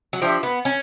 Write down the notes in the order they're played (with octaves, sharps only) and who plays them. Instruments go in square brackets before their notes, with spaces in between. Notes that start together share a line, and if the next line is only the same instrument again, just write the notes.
[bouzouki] F#3
[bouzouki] F3 [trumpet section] D4 G4 C5 E5 G5
[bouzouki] B3
C#4